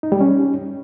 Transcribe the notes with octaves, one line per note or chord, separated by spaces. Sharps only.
D#4
G3
C#4